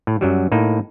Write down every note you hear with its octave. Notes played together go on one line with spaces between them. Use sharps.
A2
F#2 F#3 G3
A2 A#3 D#4